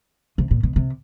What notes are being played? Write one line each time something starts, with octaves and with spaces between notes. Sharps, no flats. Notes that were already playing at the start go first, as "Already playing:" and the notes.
C3
A#2
B2
C3